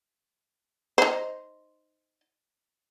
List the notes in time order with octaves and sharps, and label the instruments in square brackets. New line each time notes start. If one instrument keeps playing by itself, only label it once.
[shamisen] D#4 C5